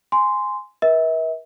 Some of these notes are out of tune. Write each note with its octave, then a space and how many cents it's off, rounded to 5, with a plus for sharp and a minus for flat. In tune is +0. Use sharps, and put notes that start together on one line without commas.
G#5 +0 C6 -10
B4 -45 E5 -40